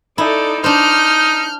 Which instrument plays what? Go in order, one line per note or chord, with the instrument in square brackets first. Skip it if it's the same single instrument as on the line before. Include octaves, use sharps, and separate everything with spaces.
[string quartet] D#4 A4 D5 [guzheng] E4
[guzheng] D4 C5 [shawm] D#4 [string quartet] F6 G6